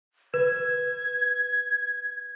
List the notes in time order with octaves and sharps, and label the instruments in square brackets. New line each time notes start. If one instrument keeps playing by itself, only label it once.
[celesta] B4 [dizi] G#6